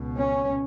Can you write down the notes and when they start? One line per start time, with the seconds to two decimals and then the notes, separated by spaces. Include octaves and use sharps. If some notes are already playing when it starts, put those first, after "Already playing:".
Already playing: C#2 B2
0.18 C#4